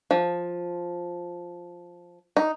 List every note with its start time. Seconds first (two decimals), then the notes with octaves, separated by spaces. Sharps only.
0.11 F3
2.37 D#4